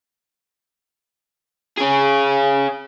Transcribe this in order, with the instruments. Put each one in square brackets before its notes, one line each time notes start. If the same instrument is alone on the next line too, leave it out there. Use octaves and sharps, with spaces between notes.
[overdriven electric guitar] C#4 G#4